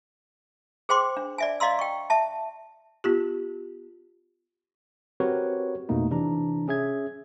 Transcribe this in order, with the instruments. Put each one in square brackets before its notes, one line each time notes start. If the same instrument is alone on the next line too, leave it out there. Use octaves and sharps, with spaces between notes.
[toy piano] G#4 C5 G5 C6 D6
D4
D5 E5 G#5
D5 D#5 F5 A#5 C6 E6
G5 C#6
E5 A5
[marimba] B3 F4 G4
[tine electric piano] C4 F#4 G4 A#4 B4 C#5
F2 B2 A3 A#3 D#4
C3 E3 D4 A#5
C#4 G#4 E5 G#6